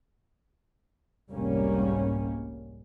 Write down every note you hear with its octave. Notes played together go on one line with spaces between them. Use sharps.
F1 C2 G#2 G3 A#3 C#4